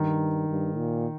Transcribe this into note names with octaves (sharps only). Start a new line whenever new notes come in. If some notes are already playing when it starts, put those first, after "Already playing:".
Already playing: G2 D#3
G2
A#2